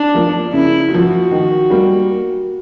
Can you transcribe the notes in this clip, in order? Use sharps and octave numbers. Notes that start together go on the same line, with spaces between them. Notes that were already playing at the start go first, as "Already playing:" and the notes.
Already playing: D4
F3 A#3
C#3 E4
F3 A#3 F#4
D#3
G3 A#3